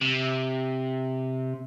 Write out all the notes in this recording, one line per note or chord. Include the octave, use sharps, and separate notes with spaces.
C3